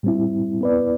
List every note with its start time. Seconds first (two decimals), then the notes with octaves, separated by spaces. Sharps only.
0.03 A2 G3 C4 E4
0.61 B3 E4 B4 D5